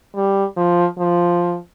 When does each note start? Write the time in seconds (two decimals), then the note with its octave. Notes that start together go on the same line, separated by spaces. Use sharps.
0.15 G3
0.56 F3
0.98 F3